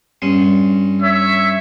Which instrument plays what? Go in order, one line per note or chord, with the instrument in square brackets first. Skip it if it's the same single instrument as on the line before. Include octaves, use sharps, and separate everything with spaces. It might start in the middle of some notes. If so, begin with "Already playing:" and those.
[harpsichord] G2 C#4 C6
[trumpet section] C#5 E5